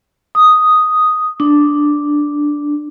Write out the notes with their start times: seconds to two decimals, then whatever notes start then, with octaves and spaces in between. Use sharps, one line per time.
0.35 D#6
1.40 D4